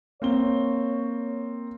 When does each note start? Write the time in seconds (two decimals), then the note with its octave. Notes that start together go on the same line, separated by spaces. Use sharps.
0.22 A#3 C4 C#5 G7